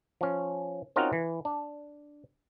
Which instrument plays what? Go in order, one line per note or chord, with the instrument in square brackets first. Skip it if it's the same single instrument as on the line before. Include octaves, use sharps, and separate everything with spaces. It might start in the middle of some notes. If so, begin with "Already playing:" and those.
[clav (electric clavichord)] F3 C#4
C4 C#4 D#4 F4 F#4 A#4
E3
D4